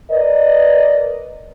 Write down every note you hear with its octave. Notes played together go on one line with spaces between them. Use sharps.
A#4 B4 D5 D#5